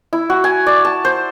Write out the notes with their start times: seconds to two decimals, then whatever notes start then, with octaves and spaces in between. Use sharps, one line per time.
0.13 E4
0.30 F#4
0.44 G#5
0.67 D5
0.85 A5
1.05 C5